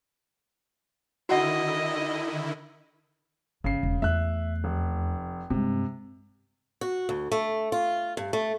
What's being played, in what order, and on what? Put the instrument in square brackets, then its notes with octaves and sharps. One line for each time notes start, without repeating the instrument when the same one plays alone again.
[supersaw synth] D3 D#3 E4 [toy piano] F#4 F#5 [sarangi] D#5
[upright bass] G1 [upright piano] C#3 C7
[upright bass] E1
[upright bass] E2 A3 [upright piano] E5 F#6
[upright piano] F1
[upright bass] G2 G#3 [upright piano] C3
[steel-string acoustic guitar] F#4
D2
A3
F4
G2
A3